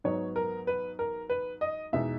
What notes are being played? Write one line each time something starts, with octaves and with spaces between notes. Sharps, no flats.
G#2 F#3 B3 D#4 C#5
A#4
B4
A#4
B4
D#5
E2 B2 G#3 D#4 E5